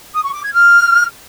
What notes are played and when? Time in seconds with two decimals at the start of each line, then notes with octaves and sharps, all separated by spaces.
0.15 D#6
0.24 C#6
0.34 D6
0.44 G#6
0.53 F6